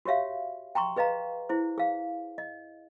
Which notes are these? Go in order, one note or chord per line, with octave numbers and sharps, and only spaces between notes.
F#4 G4 C#5 E5 F5
G5 A#5 C6 C#6
G#4 B4 D#5 F5 A#5
E4 G#4 C5
G#4 F5
D#5